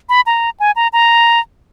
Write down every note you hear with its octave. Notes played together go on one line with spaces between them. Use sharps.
B5
A#5
G#5
A#5
A#5